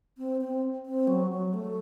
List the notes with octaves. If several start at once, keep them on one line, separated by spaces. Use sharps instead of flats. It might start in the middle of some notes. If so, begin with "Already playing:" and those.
C4
C4
C4
F#3
F#3
A3